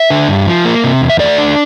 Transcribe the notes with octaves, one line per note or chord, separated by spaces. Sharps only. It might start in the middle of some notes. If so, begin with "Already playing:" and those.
Already playing: E5
D3
G2
F3
A#3
C3
E2
E5
A3 D5
D4